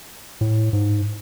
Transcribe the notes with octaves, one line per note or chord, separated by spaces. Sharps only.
A2
G#2